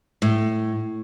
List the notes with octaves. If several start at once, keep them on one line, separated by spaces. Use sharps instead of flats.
A2